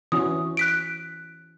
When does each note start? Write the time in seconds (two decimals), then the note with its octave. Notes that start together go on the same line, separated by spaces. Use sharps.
0.12 E3 C#4 F#4 D#6
0.57 F#6 B6 D7